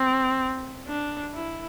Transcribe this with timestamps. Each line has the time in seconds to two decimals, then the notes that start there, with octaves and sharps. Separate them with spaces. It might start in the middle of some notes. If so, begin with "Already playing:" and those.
Already playing: C4
0.87 D4
1.33 E4